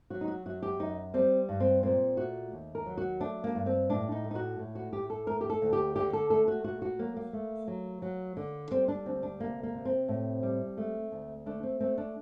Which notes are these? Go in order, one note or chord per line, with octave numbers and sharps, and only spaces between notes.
F#3 F#4
D#4
F#4
F#2 F#4
G4
F#2 D#4
G3 C4
G2
C4
A#2 C4
A3 F#4
D#2
A#4
F#3
F#4
A3 D4
A#3
G2
C4
A2 D4
D#4
A3
D#4
F#4
A2
F#4
A2 G4
A4
A3 A#4
G4
A4
D2
G4
D3 G4
A4
A3 A4
F#4
A#2 F#4
F#4
F#3 A#3
A#3
A3
F#3
F#3
D3
G3 C4
D4
D2 C4
D4
C3 A#3
A#3
C3
C4
A2
G3
A3
D2
A3 D4
C4
A3 C4
D4